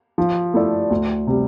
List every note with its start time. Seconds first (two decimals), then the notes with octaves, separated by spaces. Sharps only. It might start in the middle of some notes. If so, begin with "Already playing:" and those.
0.18 F3
0.54 A3 E4 A4 D5
0.90 D2
1.27 C3 G3